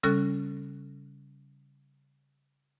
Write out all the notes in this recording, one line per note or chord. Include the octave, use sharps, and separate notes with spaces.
C#3 G3 C#4 A4 F6 F#6